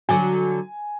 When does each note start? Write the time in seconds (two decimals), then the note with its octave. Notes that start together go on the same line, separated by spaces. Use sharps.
0.09 D3 F#3 G#5